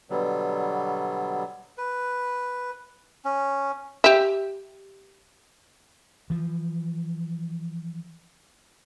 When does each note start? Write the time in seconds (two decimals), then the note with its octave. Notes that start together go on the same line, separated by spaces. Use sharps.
0.10 B2 D3 F#3 G3 B3
1.78 B4
3.25 C#4
4.04 G4 E5
6.30 E3 F3